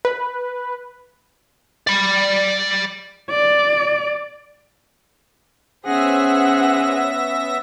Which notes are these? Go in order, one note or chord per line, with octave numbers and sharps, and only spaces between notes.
B4
D5 B5
D5
B3 C#4 G#4 C5 E5 F#5 A#6